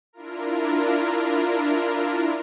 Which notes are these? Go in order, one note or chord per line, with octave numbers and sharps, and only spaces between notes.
D4 E4 F4 A#4